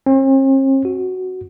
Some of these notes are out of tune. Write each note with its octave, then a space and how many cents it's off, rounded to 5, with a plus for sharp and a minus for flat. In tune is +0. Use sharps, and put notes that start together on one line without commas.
C4 +45
F#4 +5